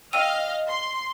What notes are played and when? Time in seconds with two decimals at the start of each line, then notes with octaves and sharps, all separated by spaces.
0.13 D#5 F5 G5 E6 F6 D#7
0.66 C6